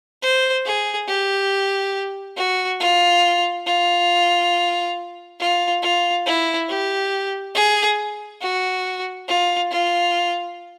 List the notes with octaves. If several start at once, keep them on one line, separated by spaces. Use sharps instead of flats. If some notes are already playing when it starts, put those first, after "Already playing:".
C5
G#4
G4
F#4
F4
F4
F4
F4
E4
G4
G#4
F#4
F4
F4